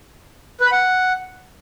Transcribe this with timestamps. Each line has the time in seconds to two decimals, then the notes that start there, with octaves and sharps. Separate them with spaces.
0.60 B4
0.66 B5
0.72 F#5